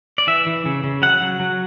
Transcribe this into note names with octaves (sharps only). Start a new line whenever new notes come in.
D5
E3 E5
E3
C#3
C#3
F#3 F#5
F#3
F#3